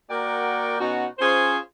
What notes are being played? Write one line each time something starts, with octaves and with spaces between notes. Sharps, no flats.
A#3 F#4 A#4 D5 F#5 G5
B2 C#4 D#4 F#4
C#4 F4 G#4 C5